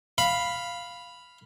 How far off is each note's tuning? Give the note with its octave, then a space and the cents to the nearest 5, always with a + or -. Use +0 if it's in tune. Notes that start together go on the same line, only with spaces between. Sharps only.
F5 +0 B5 +0